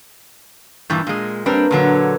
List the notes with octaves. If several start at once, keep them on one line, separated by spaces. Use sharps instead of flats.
G2 A#2 E3 E6 G6 A6
A#2 G#3
G3 A#3 C4 D4 A#4 B4
A#2 D3 F#3